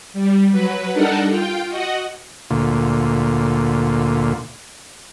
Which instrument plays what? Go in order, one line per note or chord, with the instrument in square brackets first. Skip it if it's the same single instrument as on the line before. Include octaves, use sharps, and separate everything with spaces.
[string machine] G3
F#3 B4
G3 D4 D#4 A4 A#4 F#5
F4 G5
F#4 D#5 F#5
[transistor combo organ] D2 A#2